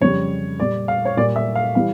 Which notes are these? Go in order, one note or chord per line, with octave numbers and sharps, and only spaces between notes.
F2 C#3 G3 C#5
A#2 G3 D5
F5
C#5
A#2 G3 D5
E5
F5
E3 G3 F5